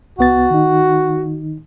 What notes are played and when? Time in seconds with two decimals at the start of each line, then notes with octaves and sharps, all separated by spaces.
0.19 C2 B3 F#4 A6
0.51 D#3 D#4